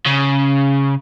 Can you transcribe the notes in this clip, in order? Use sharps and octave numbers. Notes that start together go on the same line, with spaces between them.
C#3